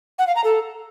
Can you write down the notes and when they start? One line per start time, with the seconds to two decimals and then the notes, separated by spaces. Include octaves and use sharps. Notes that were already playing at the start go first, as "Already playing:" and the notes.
0.19 F#5
0.27 F5
0.36 A#5
0.44 A4